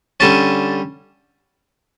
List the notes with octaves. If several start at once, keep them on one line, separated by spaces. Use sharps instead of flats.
D3 G3 C#4 A5